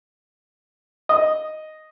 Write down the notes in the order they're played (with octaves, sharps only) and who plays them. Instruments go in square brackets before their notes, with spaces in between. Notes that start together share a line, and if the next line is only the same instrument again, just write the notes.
[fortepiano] D#5